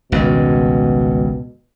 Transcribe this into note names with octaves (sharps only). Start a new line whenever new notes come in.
G#1 C#2 G2 B2